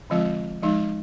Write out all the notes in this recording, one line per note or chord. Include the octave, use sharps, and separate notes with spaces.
D3 F3 G#3 C4 F4
F3 G#3 D#4